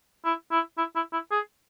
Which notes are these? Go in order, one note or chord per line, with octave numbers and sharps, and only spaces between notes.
E4
E4
E4
E4
E4
G#4